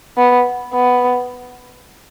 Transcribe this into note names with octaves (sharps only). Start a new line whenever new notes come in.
B3
B3